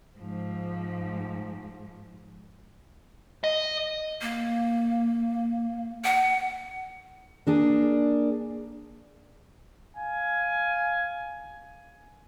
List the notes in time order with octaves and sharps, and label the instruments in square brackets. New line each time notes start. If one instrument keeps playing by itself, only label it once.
[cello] G#2 F3
[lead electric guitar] D#5
[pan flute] A#3
F#5
[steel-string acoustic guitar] A#3 D4 G#4
[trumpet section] F5 G#5